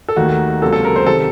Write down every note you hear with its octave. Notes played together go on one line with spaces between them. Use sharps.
A4
D#2 D#3 A3 F#4
C#2 C3 F#3 A#3 A4
A4
A#4
C5
C3 D#3 A4